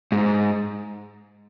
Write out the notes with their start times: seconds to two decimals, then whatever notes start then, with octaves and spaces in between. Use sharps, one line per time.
0.12 G#2